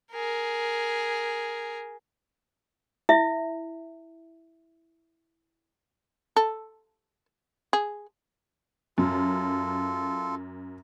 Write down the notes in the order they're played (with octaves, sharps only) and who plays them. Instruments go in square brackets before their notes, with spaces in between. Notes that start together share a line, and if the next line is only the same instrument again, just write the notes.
[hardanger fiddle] G#4 A#4
[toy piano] E4 E5
[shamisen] A4
G#4
[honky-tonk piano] F#2 [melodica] F4 A4